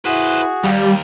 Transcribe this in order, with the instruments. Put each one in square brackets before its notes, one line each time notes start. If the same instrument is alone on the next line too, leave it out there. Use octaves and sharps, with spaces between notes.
[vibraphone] E4 E5 [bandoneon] F#4 G#4 [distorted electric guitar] B4 C5
[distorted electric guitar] D#2 [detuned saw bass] G3 [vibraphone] G4 F5